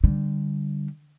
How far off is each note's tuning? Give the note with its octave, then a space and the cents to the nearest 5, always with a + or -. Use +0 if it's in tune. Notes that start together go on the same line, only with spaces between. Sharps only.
D3 +0 G3 +0